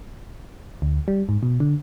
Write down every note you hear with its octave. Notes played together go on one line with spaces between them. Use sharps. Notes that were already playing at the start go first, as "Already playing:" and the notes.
D2
G3
G#2
B2
D3